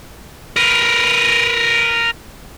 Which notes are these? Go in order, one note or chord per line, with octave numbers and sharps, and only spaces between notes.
A#4 B4